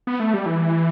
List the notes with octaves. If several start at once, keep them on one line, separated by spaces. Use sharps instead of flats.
B3
A3
G3
E3